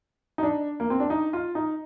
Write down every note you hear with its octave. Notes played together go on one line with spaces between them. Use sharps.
D#4
D4
A#3
C4
D4
D#4
F4
D#4